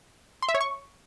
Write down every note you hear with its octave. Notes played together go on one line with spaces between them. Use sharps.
C6
E5
C#5
C#6